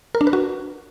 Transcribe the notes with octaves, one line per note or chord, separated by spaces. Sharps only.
A#4
D4
B4
F#4